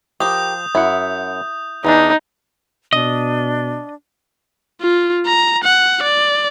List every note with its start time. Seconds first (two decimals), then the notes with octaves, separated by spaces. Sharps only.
0.20 F3 G4 A#4 D#6 G6
0.75 F#2 E4 F#5
1.85 E2 E3 D4 D#4
2.93 B2 D4 D#5
4.82 F4
5.26 A#5
5.64 F#5
6.03 D5